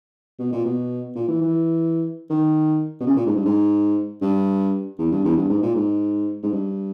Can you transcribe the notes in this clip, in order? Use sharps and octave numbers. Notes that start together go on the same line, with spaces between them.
B2
A#2
B2
A#2
E3
E3
D#3
B2
C#3
A#2
G#2
G2
G#2
G2
E2
G2
E2
G2
G#2
A#2
G#2
G#2
G2